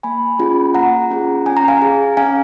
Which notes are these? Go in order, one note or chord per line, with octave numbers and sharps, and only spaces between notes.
A#3 G#5 B5
C#4 F4 G#4
A#3 F#5 A#5
C#4 F4 G#4
C#4 G#5
A#5
F5 G#5
G#4
C#4 F5 G#5